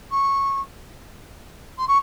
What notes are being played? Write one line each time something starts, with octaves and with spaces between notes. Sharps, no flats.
C#6
C6
C#6